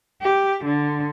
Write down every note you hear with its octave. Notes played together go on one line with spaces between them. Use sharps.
G4
D3